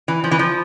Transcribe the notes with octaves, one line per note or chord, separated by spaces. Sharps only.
E3
F3
E3
F3